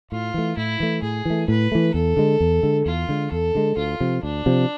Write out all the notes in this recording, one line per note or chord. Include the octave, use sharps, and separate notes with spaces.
A2 F4
E3 A3
A2 E4
E3 A3
A2 G#4
E3 A3
A2 B4
E3 A3
E2 A4
D3 G#3
E2
D3 G#3
E2 F4
D3 G#3
E2 A4
D3 G#3
D2 F4
C3 F3
D2 D4
C3 F3